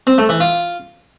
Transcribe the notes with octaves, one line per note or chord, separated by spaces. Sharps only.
C4
A3
E3
F4